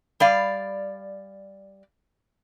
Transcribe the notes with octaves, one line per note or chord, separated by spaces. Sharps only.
G3 D5 F5